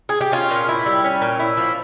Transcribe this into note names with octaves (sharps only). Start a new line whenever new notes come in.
G#4
G4
C#4 F4
A#2
E4
G3
C#4
A#2
E4
F3